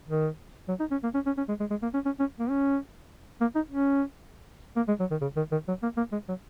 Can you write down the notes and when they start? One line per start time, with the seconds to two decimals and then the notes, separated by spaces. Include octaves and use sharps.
0.09 D#3
0.68 F#3
0.79 D#4
0.91 C#4
1.03 A#3
1.14 C#4
1.26 C#4
1.37 C#4
1.48 G#3
1.60 G#3
1.70 G#3
1.82 A#3
1.94 C#4
2.05 C#4
2.19 C#4
2.39 A#3
2.49 C#4
3.41 A#3
3.55 D#4
3.70 C#4
4.76 A#3
4.88 G#3
5.00 F#3
5.11 D#3
5.21 C#3
5.36 D#3
5.52 D#3
5.68 F#3
5.83 A#3
5.97 A#3
6.12 G#3
6.28 F#3